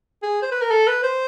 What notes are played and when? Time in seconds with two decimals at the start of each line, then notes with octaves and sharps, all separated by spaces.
0.23 G#4
0.42 C5
0.51 B4
0.61 A#4
0.71 A4
0.87 B4
1.03 C5